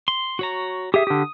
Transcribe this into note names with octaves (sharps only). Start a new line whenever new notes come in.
C6
F#4 C#5 A#5
G4 G#4 E5 D#6
D3 G4